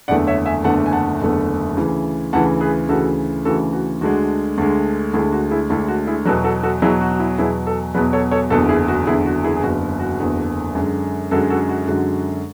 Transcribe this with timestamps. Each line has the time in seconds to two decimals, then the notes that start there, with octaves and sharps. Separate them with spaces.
0.08 F#1 E2 D3 A3 D5 F#5
0.27 C#5 E5
0.46 E5 G#5
0.64 F#1 E2 D3 A3 F#5 A5
0.86 G#5
0.93 F#5 A5
1.21 F#1 E2 D3 A3
1.77 D2 C#3 E3
2.33 D2 C#3 E3 F#5 A5
2.60 G#4 B4
2.89 D2 C#3 E3 F#4 A4
3.45 D2 C#3 E3 F#4 A4
3.73 F#4
4.01 D2 D3 G#3 F#4
4.58 D2 D3 G#3
5.14 D2 D3 G#3 E4 G#4
5.32 F#4
5.51 E4 G#4
5.70 D2 D3 G#3 E4
5.88 F#4
6.07 E4 G#4
6.25 E2 B2 F#3 F#4 A4
6.44 F#4 A4
6.63 F#4 A4
6.82 E2 B2 F#3 E4 G#4
7.01 F#4
7.12 F#4
7.19 E4
7.38 E2 B2 F#3 E4 G#4
7.67 F#4 A4
7.94 E2 B2 F#3 G#4 B4
8.13 A4 C#5
8.31 A4 C#5
8.50 F#1 E2 D3 F#4 A4
8.69 E4 G#4
8.88 F#4
9.07 F#1 E2 D3 E4 G#4
9.26 F#4
9.44 E4 G#4
9.56 G#4
9.63 F#1 E2 D3 F#4
10.00 F#4
10.19 F#1 E2 D3
10.75 F#2 D3 G#3
11.31 F#2 D3 G#3 F#4 A4
11.50 F#4 A4
11.69 F#4
11.87 F#2 D3 G#3 F#4